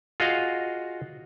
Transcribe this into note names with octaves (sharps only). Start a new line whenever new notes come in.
F4 F#4 G#4 D#5 F5